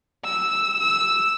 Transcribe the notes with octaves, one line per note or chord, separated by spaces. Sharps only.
E6
E6